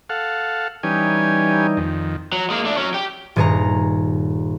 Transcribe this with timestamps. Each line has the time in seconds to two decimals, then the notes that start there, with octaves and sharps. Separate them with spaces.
0.09 A4 F5 F#5
0.83 E3 G3 C#4 D#4 G4 G#5
1.77 F2 D#3
2.33 F#3
2.50 G#3 A#3
2.65 A3 D4
2.77 F#3 C#4
2.94 G4 G5
3.36 D#1 G2 G#4 C#5 A#5